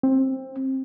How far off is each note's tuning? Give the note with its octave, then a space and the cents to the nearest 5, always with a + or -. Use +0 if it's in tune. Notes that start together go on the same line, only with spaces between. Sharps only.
C4 +15